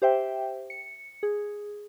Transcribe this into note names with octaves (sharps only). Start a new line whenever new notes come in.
G4 C5 E5 G5
C#7
G#4